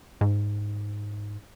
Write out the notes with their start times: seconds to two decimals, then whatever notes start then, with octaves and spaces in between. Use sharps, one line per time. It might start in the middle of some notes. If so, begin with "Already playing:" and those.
0.21 G#2